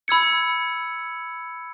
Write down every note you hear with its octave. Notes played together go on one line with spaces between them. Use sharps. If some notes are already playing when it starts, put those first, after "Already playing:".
B5 E6 G#6 C#7